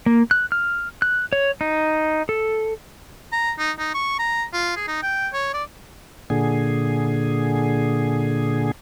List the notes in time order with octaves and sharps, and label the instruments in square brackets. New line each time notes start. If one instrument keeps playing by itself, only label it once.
[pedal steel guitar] A#3
F#6
F6
F#6
C#5
D#4
A4
[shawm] A#5
D#4
D#4
C#6
A#5
F4
G#4
D#4
G5
C#5
D5
[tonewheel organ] A#2 D3 G#4